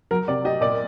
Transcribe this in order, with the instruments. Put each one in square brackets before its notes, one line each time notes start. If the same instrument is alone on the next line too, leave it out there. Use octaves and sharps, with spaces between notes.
[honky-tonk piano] F#3 [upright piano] A#4
[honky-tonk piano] C3 [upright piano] D5
[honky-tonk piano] G4 [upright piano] D#5
[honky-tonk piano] A#2 [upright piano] D5